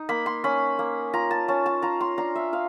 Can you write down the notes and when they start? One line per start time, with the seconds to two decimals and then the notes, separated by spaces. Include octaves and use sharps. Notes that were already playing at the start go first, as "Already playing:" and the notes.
Already playing: D#4
0.09 A#3 B5
0.26 C6
0.44 C#4 B5
0.79 A#3
1.13 F4 A#5
1.31 A5
1.48 C#4 A5
1.66 A5
1.82 F4 A#5
2.01 C6
2.18 D4 A#5
2.35 E5
2.53 F4 F5